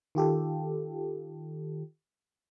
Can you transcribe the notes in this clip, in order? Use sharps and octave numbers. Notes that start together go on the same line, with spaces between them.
D#3 F4 G4 A4